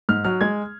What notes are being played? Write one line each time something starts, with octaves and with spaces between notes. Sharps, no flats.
G#2 F6
F#3 F6
G#3 G#6